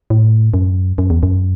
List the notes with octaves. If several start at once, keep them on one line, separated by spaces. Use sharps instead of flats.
A2
F#2
F#2
E2
F#2